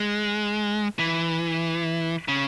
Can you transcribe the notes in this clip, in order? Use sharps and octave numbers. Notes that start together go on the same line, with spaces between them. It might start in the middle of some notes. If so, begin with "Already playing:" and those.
Already playing: G#3
E3
C#3